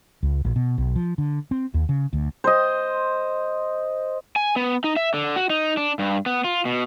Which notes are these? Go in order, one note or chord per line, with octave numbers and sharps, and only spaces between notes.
C#2
A#1
B2
B1
F3
D3
C4
D#2
C#3
D2
C5 D#5
G#5
B3
D#4
E5
D3
F#4
D#4
D4
G2
B3
F4
B2